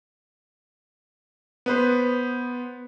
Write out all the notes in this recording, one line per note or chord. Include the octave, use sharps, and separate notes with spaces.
B3 B4 C5